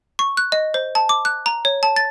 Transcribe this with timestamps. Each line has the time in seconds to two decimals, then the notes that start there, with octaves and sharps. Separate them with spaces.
0.19 C#6
0.37 F#6
0.52 D#5
0.74 C5
0.95 A5
1.09 D6
1.25 F#6
1.46 A#5
1.65 C#5
1.83 A5
1.96 A6